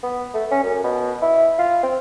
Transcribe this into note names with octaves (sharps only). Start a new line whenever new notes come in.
B3
A3
C#4
F#2
B2
E4
F4
C4